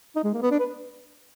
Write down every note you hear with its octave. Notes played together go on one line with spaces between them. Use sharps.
D#4
G#3
A#3
B3
D4
B4